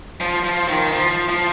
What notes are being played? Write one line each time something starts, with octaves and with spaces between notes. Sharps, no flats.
F3
F3
D#3
F3
F3